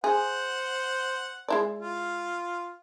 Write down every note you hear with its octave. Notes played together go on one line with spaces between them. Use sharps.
G#4 C5 F#5
G#3 E4 D5
F4